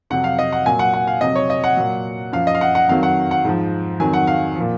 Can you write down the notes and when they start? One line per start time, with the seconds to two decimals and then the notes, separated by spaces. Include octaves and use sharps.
0.10 F2 C3 F#3 F#5
0.24 F5
0.39 D#5
0.52 F#5
0.66 A#2 F#3 G#5
0.79 F#5
0.93 F#5
1.07 F5
1.21 F2 C3 F#3 D#5
1.36 C#5
1.50 D#5
1.64 F#5
1.77 A#2 F#3
2.32 F#2 F3 F5
2.47 D#5
2.55 F5
2.61 F#5
2.75 F#5
2.89 F2 D#3 F#3 F5
3.03 F#5
3.31 F#5
3.45 G#2 F3
4.00 F2 D#3 F#3 G#5
4.13 F#5
4.27 F5
4.55 F3
4.60 A#2